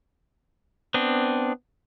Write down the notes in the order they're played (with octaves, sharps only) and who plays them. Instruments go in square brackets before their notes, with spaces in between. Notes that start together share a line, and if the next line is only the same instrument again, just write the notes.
[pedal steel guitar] B3 C4 D4